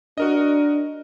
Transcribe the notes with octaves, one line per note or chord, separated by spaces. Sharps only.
D4 F#4 A#4 D#5